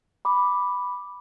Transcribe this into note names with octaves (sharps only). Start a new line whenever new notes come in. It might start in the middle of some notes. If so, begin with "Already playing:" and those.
B5 D6